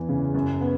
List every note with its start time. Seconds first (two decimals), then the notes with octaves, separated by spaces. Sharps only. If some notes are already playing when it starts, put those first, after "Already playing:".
Already playing: E2 E3
0.09 C#3
0.35 F#2
0.61 B3